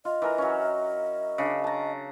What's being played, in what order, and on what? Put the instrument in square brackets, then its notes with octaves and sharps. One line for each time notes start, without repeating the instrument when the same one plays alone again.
[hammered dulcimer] F4 [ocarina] D#5
[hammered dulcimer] E3 A#4 A#5
F#3 C#4
C#3 D4
A5 A#5